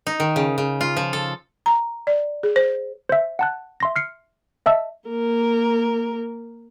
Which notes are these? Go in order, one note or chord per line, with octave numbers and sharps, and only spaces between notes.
D#4
D#3
C#3
C#3
F4
F3
A4
A#5
D5
G#4
C5
C5 E5
F#5 A5 F#6
E5 C6 A#6
F6 C7 C#7
D#5 E5 A5 E6
A#3 A#4